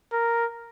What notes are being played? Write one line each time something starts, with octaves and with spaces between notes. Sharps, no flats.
A#4